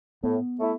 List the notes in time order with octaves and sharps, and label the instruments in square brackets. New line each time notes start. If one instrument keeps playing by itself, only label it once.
[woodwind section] A2 [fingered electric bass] B3
[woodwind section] A3 E4